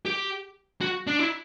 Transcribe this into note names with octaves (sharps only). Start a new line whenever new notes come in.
G4
F#4
D4
E4